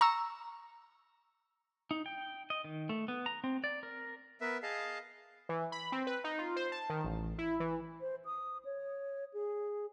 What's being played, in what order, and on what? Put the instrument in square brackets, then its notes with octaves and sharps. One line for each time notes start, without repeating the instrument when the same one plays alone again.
[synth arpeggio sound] A#5 C#6 E6
[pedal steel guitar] D#4
G5
D#5
D#3
A3
B3
A#5
C4
D5
A#4
[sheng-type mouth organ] B3 A#4 B4 E5
G#4 D#5 F5 A5
[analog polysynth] E3
B5
C4
B4
D#4
F4
C5
A5
D#3
A1
E4
E3
[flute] C5
D#6
C#5
G#4